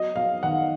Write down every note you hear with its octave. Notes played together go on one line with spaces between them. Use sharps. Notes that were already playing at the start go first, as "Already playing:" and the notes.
Already playing: F#3 D#5
F#3 F5
D#3 F#5